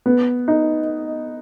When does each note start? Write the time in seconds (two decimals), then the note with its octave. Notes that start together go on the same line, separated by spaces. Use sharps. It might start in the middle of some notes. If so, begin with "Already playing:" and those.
0.06 B3
0.48 D#4